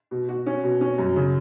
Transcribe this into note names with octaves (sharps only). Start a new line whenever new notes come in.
B2
F#4
C#4
B2
C#4
F#2
C#3